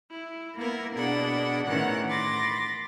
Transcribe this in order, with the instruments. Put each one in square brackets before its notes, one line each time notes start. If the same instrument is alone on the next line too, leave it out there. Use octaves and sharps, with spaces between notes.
[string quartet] E4
A#3 B3 E4 A#4
B2 D4 G#4 F#5 B5
A2 D#3 E3 C#4 F#5 F#6
B5 C6 D6 A6 A#6